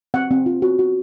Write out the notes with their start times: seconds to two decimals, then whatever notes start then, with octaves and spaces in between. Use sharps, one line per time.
0.14 C4 F#5
0.31 C4
0.46 F4
0.62 F#4
0.79 F#4